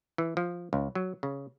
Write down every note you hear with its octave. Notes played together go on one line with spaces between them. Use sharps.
E3
F3
C#2
F#3
C#3